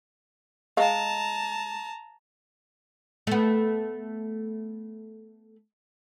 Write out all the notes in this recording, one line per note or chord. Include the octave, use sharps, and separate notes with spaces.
G#3 D#5 F5 A5 A#5
A3 B3